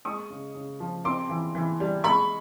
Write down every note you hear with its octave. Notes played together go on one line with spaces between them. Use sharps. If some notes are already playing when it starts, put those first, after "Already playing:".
G#3 C#6 D#6
C#3
C#3
F3
C4 C6 D6
E3
E3
G3
G#3 B5 C#6